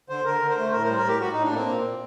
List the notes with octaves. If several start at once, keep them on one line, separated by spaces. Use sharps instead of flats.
D3 C5
D3 A#4
D3
C5
A3
A2 A#4
G3 C5
A#4
A2 G4
A2 F#4
A2 D#4
D4
A#3 C4
A#2
A#2